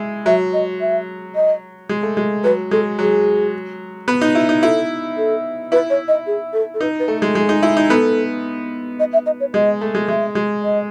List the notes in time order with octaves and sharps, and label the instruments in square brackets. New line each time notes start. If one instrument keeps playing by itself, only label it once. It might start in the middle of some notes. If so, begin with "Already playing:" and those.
Already playing: [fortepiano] G#3 E4
[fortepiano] F#3 [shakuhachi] E5
[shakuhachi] D#5
E5
D#5
[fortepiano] G#3
A3
G#3
[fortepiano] F#3 [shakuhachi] B4
[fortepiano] G#3 [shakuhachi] A4
[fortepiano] F#3 [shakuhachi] G#4
[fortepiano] B3
D#4
E4
D#4
[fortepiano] E4 [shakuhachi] A4
[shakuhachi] A4
[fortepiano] E4 [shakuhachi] B4
[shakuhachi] C#5
D#5
G#4
A4
A4
[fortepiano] D#4 [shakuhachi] B4
[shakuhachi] B4
[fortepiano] A3
[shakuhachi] A4
[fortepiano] G#3
[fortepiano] G#3 [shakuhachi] G#4
[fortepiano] D#4
E4
D#4
[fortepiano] B3 [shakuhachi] A4
[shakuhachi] D#5
E5
D#5
C#5
[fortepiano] G#3 [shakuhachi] D#5
[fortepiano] A3
G#3
[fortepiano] G#3 [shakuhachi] E5
[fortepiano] G#3
[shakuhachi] D#5